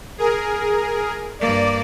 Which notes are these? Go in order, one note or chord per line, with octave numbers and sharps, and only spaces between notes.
G#4 A#4
G2 A#3 D5